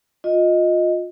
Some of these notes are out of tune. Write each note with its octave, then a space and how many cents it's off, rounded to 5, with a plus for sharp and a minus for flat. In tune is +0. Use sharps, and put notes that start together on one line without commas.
F4 +25 D#5 +5